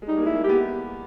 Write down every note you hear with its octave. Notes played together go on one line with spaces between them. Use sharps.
G#3
G3 D#4
A#3
G#3 E4
A#3
G4
B3